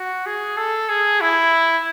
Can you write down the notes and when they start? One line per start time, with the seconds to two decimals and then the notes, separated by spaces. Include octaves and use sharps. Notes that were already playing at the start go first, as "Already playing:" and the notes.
Already playing: F#4
0.26 G#4
0.57 A4
0.89 G#4
1.21 E4